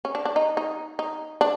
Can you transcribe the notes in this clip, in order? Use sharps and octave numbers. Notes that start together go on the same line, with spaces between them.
C#4
D4
D4
D#4
D#4
D#4
D4